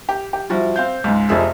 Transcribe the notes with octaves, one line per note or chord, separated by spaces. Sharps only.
G4
G4
F3 G3 E4 F#4
C4 F5 G6
C#2 G#2
F1 F2 F3 G#4 E5 E6